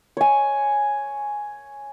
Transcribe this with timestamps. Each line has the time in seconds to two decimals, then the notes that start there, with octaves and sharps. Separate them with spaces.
0.17 C#5 G#5